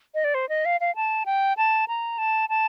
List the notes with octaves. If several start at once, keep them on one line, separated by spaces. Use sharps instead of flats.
D#5
D5
C5
D#5
F5
F5
A5
G5
A5
A#5
A5
A5